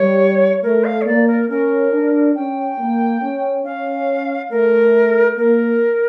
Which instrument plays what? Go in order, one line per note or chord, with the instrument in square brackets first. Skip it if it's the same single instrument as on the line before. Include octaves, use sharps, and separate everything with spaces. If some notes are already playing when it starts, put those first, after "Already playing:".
Already playing: [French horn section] G3 [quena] C#5
[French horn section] A3 [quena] A#4
[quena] F5
C#5
[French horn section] A#3 [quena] D5
[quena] A#4
[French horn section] C#4 [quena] A#4
[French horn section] D4
[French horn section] C#4 [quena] G5
[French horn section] A#3
C#4
[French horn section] C#4 [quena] F5
[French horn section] A3 [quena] A#4
[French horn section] A#3 [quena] A#4